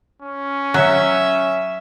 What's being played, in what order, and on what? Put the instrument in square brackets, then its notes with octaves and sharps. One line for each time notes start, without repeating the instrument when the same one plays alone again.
[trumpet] C#4
[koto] F#3 [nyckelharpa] E5